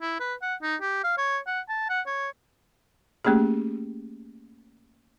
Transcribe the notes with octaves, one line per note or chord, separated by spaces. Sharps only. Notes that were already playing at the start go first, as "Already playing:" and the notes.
E4
B4
F#5
D#4
G4
F5
C#5
F#5
A5
F#5
C#5
A3 A#3 C#4 G4 G#4